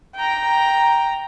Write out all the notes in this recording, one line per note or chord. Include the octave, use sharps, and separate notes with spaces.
G5 A#5